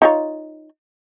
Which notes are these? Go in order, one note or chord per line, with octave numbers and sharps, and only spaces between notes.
D#4 F4 C#5